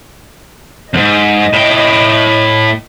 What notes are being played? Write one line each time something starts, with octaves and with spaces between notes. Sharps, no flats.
F2 G#2 D#5
A2 G5